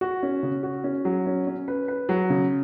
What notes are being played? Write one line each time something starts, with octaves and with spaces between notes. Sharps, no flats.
F#4
C#4
C#3
F#4
C#4
F#3
C#4
C#4
B4
B4
F#3
C#3